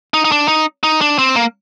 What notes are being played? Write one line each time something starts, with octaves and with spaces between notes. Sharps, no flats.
D#4
D#4
D4
D#4
D#4
D4
C4
A#3